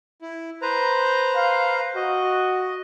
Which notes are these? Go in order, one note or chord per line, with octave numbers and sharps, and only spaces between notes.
E4
B4 C5 A#5
F5
F#4 D#5